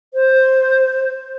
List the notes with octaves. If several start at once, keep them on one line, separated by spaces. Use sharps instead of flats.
C5